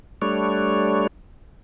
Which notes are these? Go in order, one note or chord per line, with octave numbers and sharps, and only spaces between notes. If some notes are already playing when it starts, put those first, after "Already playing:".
G3 A3 D4 C#5